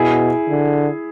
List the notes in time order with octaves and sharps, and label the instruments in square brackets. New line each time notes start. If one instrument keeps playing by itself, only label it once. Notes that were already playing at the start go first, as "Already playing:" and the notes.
Already playing: [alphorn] B2 [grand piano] E4 G#4
[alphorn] D3